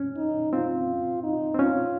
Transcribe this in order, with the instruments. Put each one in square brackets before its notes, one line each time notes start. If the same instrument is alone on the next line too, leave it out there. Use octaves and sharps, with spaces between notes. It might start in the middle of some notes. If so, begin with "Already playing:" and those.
Already playing: [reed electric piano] C#4
[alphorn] D#4
[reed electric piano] C4 [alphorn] F4
[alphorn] D#4
[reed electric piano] C4
[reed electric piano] C#4 [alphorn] F4